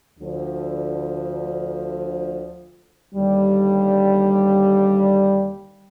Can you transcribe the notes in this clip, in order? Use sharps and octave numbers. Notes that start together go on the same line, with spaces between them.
D2 D3 F3
D#2 D3 G3